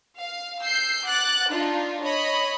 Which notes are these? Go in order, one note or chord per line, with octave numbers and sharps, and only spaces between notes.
F5
E6 G6 C7
F#5 D6 F#6 A6
D4 D#4 F4
C#5 D#5 B5